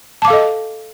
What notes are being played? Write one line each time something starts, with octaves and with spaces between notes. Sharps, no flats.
A4 D#5 F5 A5 D6